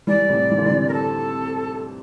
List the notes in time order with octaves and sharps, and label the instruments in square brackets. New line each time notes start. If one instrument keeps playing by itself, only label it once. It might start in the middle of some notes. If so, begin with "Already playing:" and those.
[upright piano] E3 G3 [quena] D5
[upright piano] A2 C3
E3
D3
C3 E3
[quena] A#4
A4